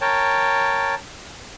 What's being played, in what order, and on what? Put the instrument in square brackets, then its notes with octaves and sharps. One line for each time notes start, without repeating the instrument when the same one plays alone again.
[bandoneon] A#4 C#5 G5 A5